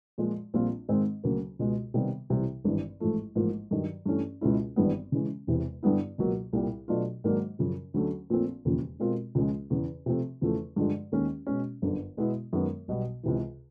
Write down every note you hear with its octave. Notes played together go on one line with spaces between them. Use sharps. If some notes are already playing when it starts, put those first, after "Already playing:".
A#2 F3 G#3
A#1 A#2 G3 C4 F4
G#2 D#3 G#3 C4 D#4
D2 C#3 F#3 A#3
C#2 B2 G#3
C3 D#3 G3 B3
C2 C3 E3 G3
G#1 G2 E3
A1 G#2 F3 A3
A1 G#2 F3 A#3
G2 D#3 F#3
G2 E3 A3 C#4
C#2 B2 G#3 C#4 E4
G#1 G2 E3 G3 B3
C#3 E3 G#3 C#4
E1 E2 C3 E3
G2 D3 G3 B3 E4
C#2 B2 F#3 A#3
C2 A#2 G3
B2 F#3 A3 D4 F4
G#2 D#3 F#3 A#3 D4
F#2 C#3 F3
D2 D3 F#3 A3 C#4
A#1 A#2 F3 A3 C4
E1 D#2 C#3 F3
B2 G#3 C4 F4 A#4
C#2 C#3 F3 G#3 C#4
E2 C#3 E3
C3 F3 A3 C4
E2 C#3 F3 A3
G2 D3 F3 G#3
D#2 D#3 G#3 C#4
B2 G#3 C#4
G1 F#2 D3
B2 G#3 B3 E4
F#2 D#3 G#3 B3
B1 B2 G3 B3
C#2 C3 E3